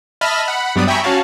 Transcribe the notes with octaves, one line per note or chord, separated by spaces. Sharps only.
D#5 E5 A5 B5 F6
F#5 B5
G2 F#3 G3 B3 D5 D#6
E5 G5 G#5 A#5 B5 C#6
C#4 F#4 C#5 F5 A5